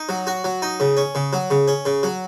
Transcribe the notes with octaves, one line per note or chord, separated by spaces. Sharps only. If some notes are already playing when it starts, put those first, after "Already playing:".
Already playing: D#4
F#3
F#4
F#3
D#4
C#3
C#4
C#3
F#3
C#3
C#4
C#3
F#3